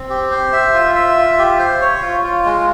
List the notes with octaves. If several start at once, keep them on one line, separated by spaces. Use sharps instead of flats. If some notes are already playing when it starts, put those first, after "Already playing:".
Already playing: C4
G4
C5
E5
F4
E5
F4
G4
C5
C#5
F4
F4
G#3